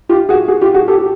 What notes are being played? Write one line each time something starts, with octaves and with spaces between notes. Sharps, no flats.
F4 G4
F#4 G#4
F#4 G#4
F4 G4
F#4 G#4
G4 A4
G4